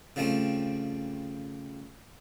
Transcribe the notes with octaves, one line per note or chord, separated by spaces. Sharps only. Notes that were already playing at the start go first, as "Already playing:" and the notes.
C#3 F3 G3 A3 C4